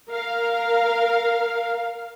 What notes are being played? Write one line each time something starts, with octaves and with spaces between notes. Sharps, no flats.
A#4 F5